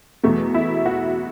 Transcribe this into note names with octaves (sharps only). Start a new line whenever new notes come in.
E2 B2 F#3 A3
E4
F#4